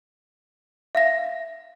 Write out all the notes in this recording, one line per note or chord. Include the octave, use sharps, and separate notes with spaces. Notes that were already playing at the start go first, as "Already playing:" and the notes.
E5 F5 A#6